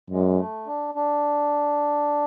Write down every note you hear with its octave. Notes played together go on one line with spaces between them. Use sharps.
F#2 G#3
A3
D4
D4